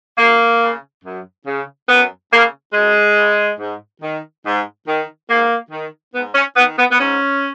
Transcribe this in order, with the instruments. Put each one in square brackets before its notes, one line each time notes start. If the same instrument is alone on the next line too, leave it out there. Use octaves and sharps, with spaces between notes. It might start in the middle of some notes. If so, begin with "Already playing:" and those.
[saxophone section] F#2 A#3
C#3
F#2
C#3
F#2 B3
C#3 A#3
F#2 G#3
C#3
G#2
D#3
G#2
D#3
G#2 A#3
D#3
G#2 B3
C#4
D#3 B3
B3
B3
G#2 C#4